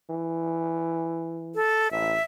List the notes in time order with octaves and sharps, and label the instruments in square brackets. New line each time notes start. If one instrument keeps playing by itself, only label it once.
[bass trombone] E3
[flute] A4
[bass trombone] A1 [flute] E5